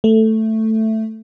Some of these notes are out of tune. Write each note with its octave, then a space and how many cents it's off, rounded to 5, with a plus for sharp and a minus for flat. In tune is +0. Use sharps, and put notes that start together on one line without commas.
A3 +5